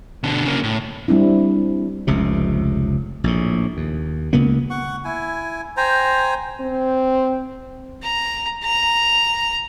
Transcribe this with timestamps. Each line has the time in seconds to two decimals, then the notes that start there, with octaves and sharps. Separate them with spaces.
0.24 B2 D3
0.45 C#3 A#3
0.63 A2
1.08 G3 C4 D4 E4
2.07 F1 C#2 C3
3.24 A#1 A2
3.77 D#2
4.33 C#2 C#3 A#3 B3
4.70 F#5 C#6
5.05 E4 G#5
5.77 C5 G5 G#5 A#5
6.61 C4
8.03 A#5
8.63 A#5